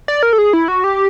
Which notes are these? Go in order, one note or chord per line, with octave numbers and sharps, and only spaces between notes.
D5
A#4
A4
G#4
E4
F#4
G4